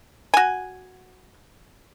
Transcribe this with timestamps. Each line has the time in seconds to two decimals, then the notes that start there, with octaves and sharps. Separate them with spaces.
0.34 F#4 G#5